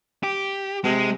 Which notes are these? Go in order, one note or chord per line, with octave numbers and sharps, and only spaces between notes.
G4
C3 G#3